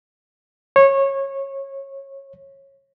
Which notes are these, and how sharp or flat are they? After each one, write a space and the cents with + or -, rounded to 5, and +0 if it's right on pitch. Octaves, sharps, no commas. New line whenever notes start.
C#5 -20